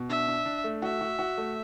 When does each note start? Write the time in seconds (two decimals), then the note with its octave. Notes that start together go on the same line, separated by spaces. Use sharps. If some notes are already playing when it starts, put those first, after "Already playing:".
Already playing: B2
0.09 D4 E5
0.28 D4
0.45 D4
0.64 A3
0.82 F#4 E5
1.01 F#4
1.19 F#4
1.38 A3